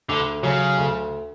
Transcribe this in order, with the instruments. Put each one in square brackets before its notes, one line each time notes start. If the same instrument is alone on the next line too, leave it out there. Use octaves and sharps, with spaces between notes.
[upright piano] D2 [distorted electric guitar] D3
[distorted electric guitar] C#3 [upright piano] F#3
[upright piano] D2